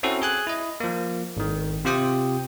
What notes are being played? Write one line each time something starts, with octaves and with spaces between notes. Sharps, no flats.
C4 C#4 E4 F#4 A4
G#4 G#5 F#6
E4 D#5
F3 A#3
G#1 D#3
C3 C4 F4 G4 G5 D#6